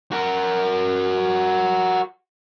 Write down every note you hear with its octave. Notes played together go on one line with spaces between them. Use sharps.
F#4 A#4